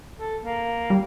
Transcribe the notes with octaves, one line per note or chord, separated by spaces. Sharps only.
A4
A#3
G3